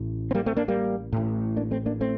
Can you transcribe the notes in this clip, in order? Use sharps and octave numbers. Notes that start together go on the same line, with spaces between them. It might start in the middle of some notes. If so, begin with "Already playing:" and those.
Already playing: A1 A2
C4
G3 A#3
A3 C4
A#3 D4
G3 A#3
A1 A2
A#3 D4
A3 C4
A#3 D4
A3 C4